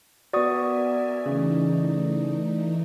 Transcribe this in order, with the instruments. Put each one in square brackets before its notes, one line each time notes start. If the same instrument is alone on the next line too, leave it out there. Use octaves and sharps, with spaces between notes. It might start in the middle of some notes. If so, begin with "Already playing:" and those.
[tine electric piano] B3 F#4 [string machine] A#4 E5 G#5 [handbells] D5 C#6 D#6
[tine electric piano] C#3 [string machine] E3 A3 D#4